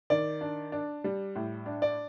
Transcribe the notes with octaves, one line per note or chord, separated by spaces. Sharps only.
D#3 D5
D4
D4
G3
A2
D4
D5